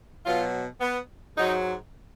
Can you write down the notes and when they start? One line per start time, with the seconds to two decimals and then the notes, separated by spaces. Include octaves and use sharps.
0.25 B2 F#3 F4
0.80 B3
1.36 G#2 F#3 D#4